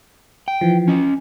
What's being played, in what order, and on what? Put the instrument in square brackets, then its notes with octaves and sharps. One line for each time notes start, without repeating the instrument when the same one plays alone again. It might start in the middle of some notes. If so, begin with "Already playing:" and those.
[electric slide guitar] G5
[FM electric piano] E3 F3
[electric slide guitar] C#4 D#5